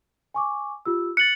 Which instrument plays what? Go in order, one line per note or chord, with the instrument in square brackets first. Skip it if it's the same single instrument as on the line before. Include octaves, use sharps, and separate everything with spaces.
[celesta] G#5 C#6 D6
F4 G4 E6
[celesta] F#6 A6 [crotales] C#7 F#7